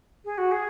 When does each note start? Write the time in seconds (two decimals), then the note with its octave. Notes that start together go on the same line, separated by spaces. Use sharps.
0.24 G#4
0.37 F#4
0.51 G#4